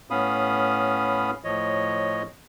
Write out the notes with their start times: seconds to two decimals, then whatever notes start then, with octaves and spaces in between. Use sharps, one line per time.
0.10 A2 B3 C#4 F5 B5 D#6
1.44 A2 F3 C#5 D#5